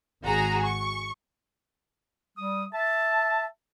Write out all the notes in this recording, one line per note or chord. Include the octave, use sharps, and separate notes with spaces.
G#1 F#4 G#4 A#5
C#6
G3 D#6
E5 A5